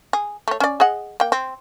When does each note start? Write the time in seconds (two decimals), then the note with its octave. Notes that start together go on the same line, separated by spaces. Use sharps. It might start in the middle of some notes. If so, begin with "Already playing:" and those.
0.13 G#4
0.48 A3 C#5
0.60 C#4 D5
0.80 G#4 D#5 F#5
1.20 A#3 G5
1.32 C4